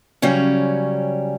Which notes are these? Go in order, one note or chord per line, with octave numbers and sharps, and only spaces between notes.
C#3 F#3 G3 C#4